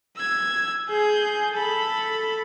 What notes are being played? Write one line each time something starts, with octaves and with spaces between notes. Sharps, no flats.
E6 G#6
G#4 G6
A4 B5